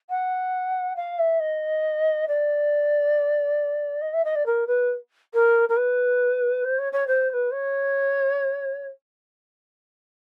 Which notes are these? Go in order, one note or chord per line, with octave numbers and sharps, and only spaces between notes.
F#5
F5
E5
D#5
D5
D#5
E5
D#5
D5
A#4
B4
A#4
A#4
B4
C5
C#5
C#5
C5
C5
B4
C#5